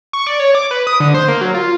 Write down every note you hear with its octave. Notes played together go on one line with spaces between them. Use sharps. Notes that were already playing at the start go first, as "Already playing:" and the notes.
C#6
D5
C#5
D6
B4
D#6
D3
C5
A#3
F#3
F4